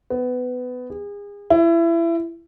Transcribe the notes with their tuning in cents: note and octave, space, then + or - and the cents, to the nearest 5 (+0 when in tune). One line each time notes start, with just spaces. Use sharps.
B3 +20
G#4 -35
E4 +25